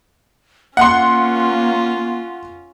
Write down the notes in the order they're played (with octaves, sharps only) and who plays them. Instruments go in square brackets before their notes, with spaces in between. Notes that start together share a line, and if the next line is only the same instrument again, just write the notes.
[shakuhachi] A#3 [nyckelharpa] C#4 F4 [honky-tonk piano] F#5 C6